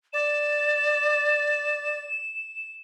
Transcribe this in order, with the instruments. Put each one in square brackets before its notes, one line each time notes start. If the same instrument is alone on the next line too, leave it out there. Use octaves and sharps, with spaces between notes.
[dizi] D5 [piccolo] E7